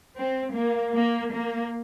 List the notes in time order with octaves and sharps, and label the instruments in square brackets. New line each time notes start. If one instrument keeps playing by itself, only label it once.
[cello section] C4
A#3
A#3
A#3